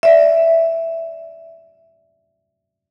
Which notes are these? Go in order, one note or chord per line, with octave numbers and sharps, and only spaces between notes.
D5 E5